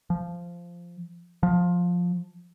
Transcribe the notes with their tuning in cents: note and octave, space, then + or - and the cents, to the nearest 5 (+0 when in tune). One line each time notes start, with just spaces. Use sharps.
F3 -10
F3 +15